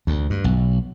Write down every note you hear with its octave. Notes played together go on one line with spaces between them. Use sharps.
D2
G2
B1